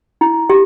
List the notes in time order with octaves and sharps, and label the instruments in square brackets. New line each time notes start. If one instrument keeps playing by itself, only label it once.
[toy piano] E4
G4